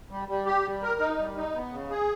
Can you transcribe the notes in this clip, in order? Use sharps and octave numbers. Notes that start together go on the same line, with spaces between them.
G3
G3
G4
G3
A#4
D#4
G3
D#4
B3
C#3
G#4